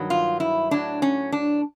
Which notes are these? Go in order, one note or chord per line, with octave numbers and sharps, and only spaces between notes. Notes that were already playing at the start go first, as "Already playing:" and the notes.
Already playing: G2 D#3 F#3
F4
E4
A2 F#3 D4
C#4
D4